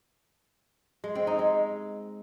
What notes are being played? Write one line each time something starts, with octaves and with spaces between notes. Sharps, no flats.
G#3
C4
D#4
G#3